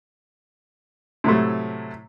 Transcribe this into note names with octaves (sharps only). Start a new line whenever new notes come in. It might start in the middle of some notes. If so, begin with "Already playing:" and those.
A2 C3 F#3 A3